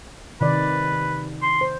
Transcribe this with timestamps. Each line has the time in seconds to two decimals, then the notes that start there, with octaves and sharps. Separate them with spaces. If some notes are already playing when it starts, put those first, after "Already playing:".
0.41 C3 D#3 B4 D5
1.42 C6
1.61 C5